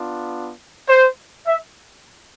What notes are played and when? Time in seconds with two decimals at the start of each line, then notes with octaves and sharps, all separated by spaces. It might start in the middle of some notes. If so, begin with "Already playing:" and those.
Already playing: B3 D4 F4
0.87 C5
1.46 E5